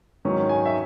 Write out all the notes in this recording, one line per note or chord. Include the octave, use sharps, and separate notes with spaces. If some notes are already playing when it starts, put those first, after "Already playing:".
G#2 D#3 F#3 C#4
G#5
E5